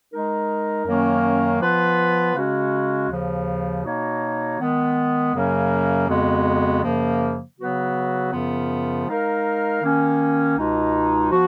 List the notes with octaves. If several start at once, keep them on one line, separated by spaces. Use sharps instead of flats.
G#3 D#4 A#4
F#2 D#3 F#3 A#3 C#4
F3 B3 F4 B4
C#3 G#3 C#4 F#4
D#2 C#3 F3
B2 A#3 D#4 F#4 C#5
D#3 G#3 B3
F#2 C#3 F#3 A#3 C#4
F2 C#3 G#3 B3 F#4
F#2 C#3 F3 A#3
C#3 F#3 B3 F#4 B4
F#2 C#3 F3 B3 F4
G#3 D#4 A#4 F5
D#3 A#3 C#4
C#2 B2 G#3 D#4
F3 B3 F#4